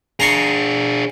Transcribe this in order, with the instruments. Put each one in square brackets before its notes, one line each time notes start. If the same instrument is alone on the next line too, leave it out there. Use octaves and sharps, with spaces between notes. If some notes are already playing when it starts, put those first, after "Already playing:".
[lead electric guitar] D4 G#4 [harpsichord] A#5 C6 C#6